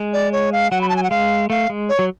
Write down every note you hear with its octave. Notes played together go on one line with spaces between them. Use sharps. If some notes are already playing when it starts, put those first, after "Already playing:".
Already playing: G#3
D5
C#5
F5
F#3 F#5
B5
A5
G#5
F#5
G#3 F5
A3 F5
G#3
C#5
F#3